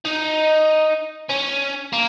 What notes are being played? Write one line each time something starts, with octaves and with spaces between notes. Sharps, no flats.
D#4
C#4
A#3